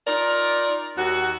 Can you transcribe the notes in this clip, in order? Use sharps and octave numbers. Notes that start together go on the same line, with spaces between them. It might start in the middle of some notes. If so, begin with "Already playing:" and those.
D#4 F4 A#4 D5
D#2 F#4